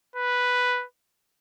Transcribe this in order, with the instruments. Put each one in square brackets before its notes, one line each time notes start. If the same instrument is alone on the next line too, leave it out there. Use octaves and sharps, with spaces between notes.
[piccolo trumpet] B4